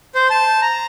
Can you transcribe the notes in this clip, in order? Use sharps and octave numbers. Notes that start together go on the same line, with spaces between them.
C5
A5
A#5